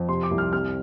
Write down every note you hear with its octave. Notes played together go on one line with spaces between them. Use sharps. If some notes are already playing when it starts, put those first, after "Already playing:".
Already playing: F2
C3 C6
D6
C2
F6
C3 F6